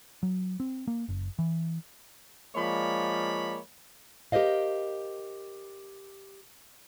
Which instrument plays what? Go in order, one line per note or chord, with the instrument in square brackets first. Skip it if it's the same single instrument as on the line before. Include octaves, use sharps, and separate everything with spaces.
[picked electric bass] F#3
C4
A#3
F#1
E3
[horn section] F3 G#3 A#3 C#5 D5 B5
[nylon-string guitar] G4 A#4 C5 D#5 F5